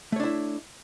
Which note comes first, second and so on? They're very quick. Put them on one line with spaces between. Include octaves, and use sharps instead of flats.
A3 C#5 D4 E4